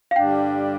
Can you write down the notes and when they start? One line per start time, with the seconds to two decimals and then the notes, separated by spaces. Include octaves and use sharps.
0.11 F5
0.16 G2 D3 G3 D4 G5